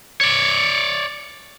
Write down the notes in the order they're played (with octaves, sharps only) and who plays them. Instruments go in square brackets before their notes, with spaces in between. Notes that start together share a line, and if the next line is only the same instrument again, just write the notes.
[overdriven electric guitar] C#5 D5